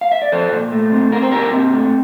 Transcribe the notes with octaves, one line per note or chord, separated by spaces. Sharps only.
F5
E5
D5
F3 A4 C5
A#2
A3
C4
C4 A#4
C5
A#2 G4 A#4
C4
A3